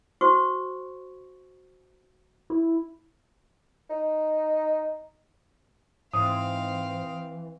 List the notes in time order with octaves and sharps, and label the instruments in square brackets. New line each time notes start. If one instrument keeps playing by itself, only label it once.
[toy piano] F#4 C5 C#6
[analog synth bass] E4
[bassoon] D#4
[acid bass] G#2 [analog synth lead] E3 [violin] C4 F5 [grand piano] D#6